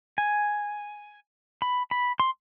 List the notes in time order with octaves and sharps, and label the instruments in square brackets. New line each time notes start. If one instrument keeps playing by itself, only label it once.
[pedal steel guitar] G#5
B5
B5
C6